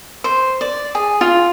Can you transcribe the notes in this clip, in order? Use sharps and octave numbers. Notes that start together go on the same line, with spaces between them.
C5
D5
G#4
F4